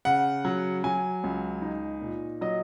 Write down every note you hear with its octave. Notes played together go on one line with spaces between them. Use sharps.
C#3 F#5
F#3
F#3 G#5
C#2
D#4
A#2
F#3 D#5